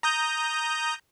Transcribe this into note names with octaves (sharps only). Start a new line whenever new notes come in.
A#5 D#6 G6